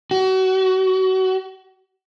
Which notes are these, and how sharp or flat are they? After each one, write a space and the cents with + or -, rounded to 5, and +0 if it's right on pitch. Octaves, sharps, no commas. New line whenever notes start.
F#4 +30